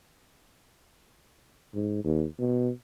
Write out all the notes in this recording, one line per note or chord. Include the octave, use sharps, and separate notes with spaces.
G#2
D#2
B2